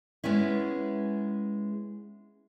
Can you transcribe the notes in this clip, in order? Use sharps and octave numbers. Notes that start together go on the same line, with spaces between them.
G#3 B3 C#4 E4